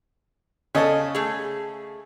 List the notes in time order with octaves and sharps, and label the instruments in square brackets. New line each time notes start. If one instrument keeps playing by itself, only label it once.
[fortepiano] C#3 A4 [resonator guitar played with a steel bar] C#5 D#5
[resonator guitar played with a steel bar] A3 G#4